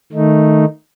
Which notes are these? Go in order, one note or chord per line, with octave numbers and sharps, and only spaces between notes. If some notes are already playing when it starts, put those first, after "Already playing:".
D#3 A3 D#4